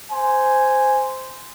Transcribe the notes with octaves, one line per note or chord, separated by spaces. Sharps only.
C5 G#5